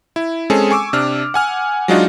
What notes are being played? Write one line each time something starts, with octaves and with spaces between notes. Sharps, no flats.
E4
G#3 C4 C#4 G#4 A4
G#5 C#6 D6 E6
C3 D4 F6
F#5 G#5 F6
F#3 G#3 D4 D#4 F4 F#4